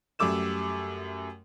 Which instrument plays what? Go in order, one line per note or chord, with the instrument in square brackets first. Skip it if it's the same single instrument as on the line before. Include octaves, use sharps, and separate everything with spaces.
[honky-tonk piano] F#2 G3 A3 D6 E6 E7